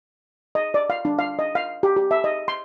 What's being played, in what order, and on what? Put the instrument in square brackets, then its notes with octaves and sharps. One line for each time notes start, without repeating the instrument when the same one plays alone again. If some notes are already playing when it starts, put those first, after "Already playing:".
[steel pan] D#5
D5
F5
D4
F5
D#5
F5
G4
G4
E5
D#5
C6